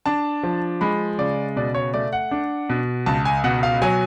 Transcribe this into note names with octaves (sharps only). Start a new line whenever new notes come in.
D4 A5
F3
G#3 B5
C#3 D5
B2 D5
C#5
A3 D5
F#5
D4
B2
C#2 A5
G#5
B2 F#5
F5
F#3 G#5